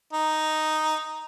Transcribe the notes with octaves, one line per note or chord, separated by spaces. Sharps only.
D#4